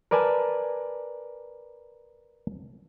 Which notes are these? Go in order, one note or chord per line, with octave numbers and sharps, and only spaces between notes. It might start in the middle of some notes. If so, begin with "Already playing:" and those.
A#4 B4 D5 G#5 A5